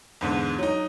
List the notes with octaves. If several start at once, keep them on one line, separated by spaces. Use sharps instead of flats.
E2 G#2 D3
F#3 D#4